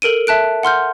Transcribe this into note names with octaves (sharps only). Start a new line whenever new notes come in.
A4 A#4 D7 D#7
E5 A5 F#6 D7
F#5 C6 F6 G6